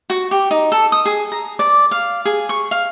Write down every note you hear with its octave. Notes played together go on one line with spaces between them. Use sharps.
F#4
G4
D#4
A4
D#6
G#4
A#5
D5
F5
G#4
C#6
F5